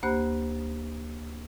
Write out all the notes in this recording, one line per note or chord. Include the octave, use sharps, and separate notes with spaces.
D2 A#3 G4 C5 B5 F#6